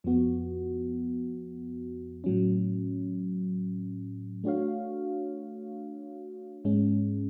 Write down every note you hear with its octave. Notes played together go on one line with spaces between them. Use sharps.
F2 F3 B3 F#4
A2 F#3 C#4
A3 D4 F#4 C#5 F5
G#2 G#3 C#4